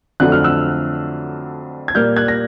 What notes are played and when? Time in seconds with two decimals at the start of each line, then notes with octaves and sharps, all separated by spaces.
0.20 F2 D3 F#3 A3 F#6
0.32 F6
0.44 E6 F#6
1.88 G#6
1.95 A#2 G3 A#3 F6 G6
2.16 F#6 G#6
2.28 A#6